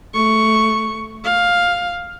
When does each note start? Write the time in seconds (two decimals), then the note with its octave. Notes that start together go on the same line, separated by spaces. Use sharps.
0.14 A3 C#6
1.24 F5